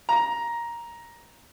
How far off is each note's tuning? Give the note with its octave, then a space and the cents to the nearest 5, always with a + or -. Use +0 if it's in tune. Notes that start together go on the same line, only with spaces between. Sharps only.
A#5 +10